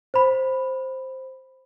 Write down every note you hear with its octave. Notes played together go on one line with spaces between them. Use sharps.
C5 B5